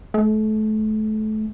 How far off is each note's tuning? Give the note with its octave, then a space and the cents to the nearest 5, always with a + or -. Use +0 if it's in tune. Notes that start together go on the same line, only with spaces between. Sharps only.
A3 -30